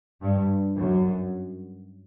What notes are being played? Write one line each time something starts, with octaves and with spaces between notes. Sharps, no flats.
G2
F#2